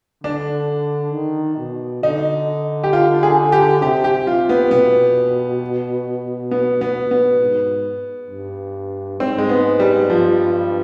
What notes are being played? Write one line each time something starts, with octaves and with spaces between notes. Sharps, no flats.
D3 D4
D#3
B2
D3 D#4
G4
F4
G#4
G4
C3 G4
G4
F4
B3
B2 B3
B3
B3
B3
G#2
G2
G#2 C4
G#3
B3
G3
G2 F3